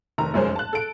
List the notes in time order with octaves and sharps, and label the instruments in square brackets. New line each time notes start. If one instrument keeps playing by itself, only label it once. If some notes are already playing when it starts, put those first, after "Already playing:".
[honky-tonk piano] F1 D#3 A#5
F1 F#2 G#3 C#4 A#4 C5
A5 F#6
A4 D7